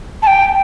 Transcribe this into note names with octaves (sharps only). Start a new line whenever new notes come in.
A5
G5